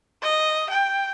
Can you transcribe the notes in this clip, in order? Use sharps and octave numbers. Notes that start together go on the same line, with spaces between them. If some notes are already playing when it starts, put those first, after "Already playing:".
D#5
G5